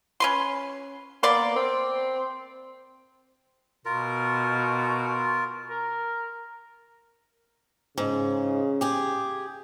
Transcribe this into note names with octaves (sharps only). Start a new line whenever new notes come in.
C#4 B4 C6
A#3 B3 D5 C6
C4
B2 F4 A#4
A#4
G#2 C#3
G4 G#4